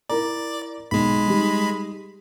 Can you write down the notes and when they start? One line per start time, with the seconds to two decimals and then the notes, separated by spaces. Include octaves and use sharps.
0.10 E4 A#4 D5 A#5
0.91 B1 G#3 B5
1.27 G3 D#4